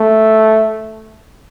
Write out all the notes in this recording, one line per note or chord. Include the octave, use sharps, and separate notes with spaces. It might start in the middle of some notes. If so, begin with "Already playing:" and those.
Already playing: A3